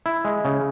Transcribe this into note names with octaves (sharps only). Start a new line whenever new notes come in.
E4
G#3
C#3